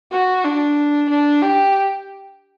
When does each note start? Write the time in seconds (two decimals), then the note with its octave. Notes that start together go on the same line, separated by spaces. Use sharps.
0.12 F#4
0.44 D4
1.10 D4
1.42 G4